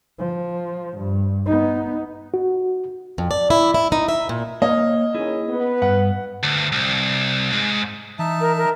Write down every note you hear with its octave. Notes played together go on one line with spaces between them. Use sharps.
F3
G2
B3 D#4
F#4
F2
D5
E4
E4
D#4
E5
A#2
A#3 C#5 D#5 F5
D#3 C#4 E4 G#4
B3 B4
G2 F#5
D2
C2
G#2
E3 D#4 E5 A5
A#4
A#4